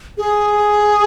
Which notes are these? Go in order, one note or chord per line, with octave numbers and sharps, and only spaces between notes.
G#4